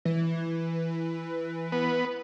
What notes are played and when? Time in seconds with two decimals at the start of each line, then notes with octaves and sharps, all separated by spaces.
0.05 E3
1.72 B3